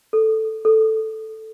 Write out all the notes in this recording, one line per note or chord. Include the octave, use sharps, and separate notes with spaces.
A4
A4